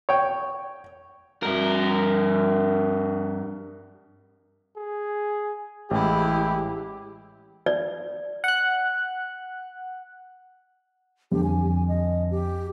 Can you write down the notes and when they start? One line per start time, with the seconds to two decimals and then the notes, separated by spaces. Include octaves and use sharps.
0.09 C#5 G5
1.43 G2 A#4
4.77 G#4
5.91 A1 G#3 E4 G4
7.66 D5
8.44 F#5 F#6
11.32 F2 D3 G4
11.44 G#5
11.88 D#5
12.31 G4